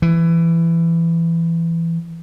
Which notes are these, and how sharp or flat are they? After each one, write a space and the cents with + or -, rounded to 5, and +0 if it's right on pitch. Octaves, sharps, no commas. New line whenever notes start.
E3 +15